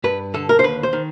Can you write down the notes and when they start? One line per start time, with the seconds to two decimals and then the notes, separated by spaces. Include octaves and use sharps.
0.04 G2 B4
0.34 D3 A4
0.49 A#4
0.59 C5
0.63 D#2 B4
0.83 C5
0.93 D#3